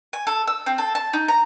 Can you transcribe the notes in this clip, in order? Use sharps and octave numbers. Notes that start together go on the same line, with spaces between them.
G#5
A4
E6
C4
A4
A5
D#4
A#5